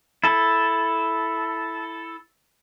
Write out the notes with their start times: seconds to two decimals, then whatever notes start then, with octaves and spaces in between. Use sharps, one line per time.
0.24 E4 A4